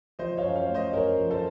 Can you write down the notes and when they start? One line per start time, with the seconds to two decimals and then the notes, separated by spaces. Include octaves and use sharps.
0.19 F3 C5 D#5
0.37 C#5 F5
0.43 F#2
0.56 C#5 F5
0.69 A3
0.74 C5 D#5
0.93 F#2 A#4 C#5
1.19 F3
1.31 A4 C5